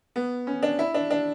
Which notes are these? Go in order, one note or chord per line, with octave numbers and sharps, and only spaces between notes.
B3
C#4
D4
E4
D4
D4